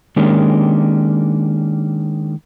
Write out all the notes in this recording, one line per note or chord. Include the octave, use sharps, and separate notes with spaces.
D#3 G#3 A#3 C#4 D4 G4